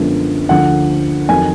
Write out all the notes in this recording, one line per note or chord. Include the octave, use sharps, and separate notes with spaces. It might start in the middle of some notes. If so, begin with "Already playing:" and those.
Already playing: F#2 D3 F3 G#3 B3
D2 D3 F3 F#5
F2 D#3 F#3 G#5